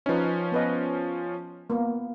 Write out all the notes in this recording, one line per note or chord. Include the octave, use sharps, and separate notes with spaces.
F3 C#4 D#4 B4
B3 B4 D#5
A#3 B3